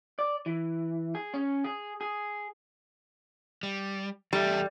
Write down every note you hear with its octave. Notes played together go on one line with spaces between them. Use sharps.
D5
E3
G#4
C#4
G#4
G#4
G3
E2 G3 A4 E5